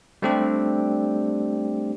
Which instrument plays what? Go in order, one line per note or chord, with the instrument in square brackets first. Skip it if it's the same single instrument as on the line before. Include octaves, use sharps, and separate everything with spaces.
[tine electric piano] G3 A3 C4 D4 G4